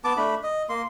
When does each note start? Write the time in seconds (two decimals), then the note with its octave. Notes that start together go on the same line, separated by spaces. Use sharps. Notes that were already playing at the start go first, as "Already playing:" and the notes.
0.04 B3 A5 D6
0.17 A3 D4 B5
0.43 D#5
0.69 A#3 C6